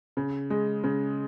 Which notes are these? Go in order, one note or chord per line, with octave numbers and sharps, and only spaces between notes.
C#3
G#3
C#3